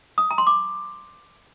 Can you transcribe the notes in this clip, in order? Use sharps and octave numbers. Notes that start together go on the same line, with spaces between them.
D#6
A#5
C6
D6